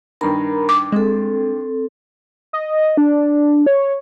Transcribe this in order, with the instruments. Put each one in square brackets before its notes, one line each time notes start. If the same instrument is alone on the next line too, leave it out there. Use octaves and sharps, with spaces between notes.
[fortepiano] G2 D#3 [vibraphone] A#4 A#5 B5
[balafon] D6
[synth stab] G#3 [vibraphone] C4 A4
[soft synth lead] D#5
D4
C#5